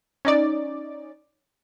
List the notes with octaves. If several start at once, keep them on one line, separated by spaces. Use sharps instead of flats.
C#4 D#4 D5